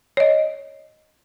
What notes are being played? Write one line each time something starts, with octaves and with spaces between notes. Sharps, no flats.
C#5 D#5